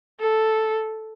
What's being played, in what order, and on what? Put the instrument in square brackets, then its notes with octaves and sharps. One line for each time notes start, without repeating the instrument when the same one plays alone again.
[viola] A4